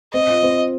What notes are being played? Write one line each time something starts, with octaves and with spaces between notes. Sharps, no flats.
C4 D#5
F4
C4